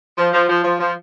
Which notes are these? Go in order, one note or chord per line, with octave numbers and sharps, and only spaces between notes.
F3
F3
F3
F3
F3